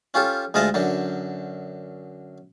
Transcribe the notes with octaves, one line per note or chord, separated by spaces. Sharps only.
C#4 F4 G4 A4
D2 G#3 F4 D#5 E5 A5
F#2 D3 D4